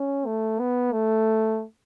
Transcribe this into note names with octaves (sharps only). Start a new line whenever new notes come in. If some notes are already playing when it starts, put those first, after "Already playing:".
Already playing: C#4
A3
B3
A3